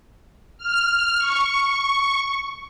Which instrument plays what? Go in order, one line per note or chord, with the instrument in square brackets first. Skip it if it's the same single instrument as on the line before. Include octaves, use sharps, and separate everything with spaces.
[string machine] F6
C#6